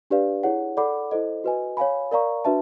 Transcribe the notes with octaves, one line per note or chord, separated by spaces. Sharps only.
D4 G4 B4 D5 F5
E4 G#4 C#5 F#5
A4 D5 F#5 B5 D6
E4 A4 C5 D#5
F#4 B4 D#5 G#5
C#5 F5 G#5 B5
A#4 D5 F5 A#5 C#6
D4 F#4 B4 E5 A5